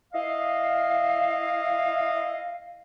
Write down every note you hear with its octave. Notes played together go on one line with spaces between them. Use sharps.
E4 D#5 F5